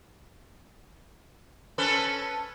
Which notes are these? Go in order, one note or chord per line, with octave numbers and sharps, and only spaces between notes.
C#4 A4 B4